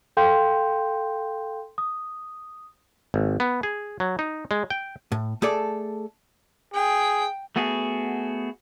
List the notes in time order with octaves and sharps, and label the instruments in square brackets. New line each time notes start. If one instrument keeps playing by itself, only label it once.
[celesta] A4 F5 G5 C6 G6
D#6
[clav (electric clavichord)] G#1
B3
G#4
F#3
D#4
G#3
G5
[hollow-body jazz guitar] A2
A3 G#4 A4 D5
[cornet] G#4 [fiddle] G5
[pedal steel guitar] A3 B3 F#4 G#4